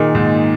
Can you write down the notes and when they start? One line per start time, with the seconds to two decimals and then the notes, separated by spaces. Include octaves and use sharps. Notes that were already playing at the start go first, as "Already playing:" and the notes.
Already playing: A#2 D#3 A#3 D#4 G#4 D#5
0.15 G#2